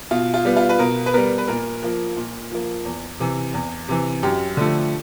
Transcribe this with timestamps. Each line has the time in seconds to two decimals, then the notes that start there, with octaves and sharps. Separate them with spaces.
0.11 B2 F4
0.34 F4
0.45 G3 B3
0.57 F4
0.69 B4
0.79 B2 A#4
1.06 B4
1.14 G3 B3 A#4
1.38 B4
1.48 A#2 A#4
1.83 F3 A#3
2.16 A#2
2.51 F3 A#3
2.85 E2
3.20 C3 E3
3.54 E2
3.88 C3 E3
4.23 F#2 G4
4.57 D3 F3 A3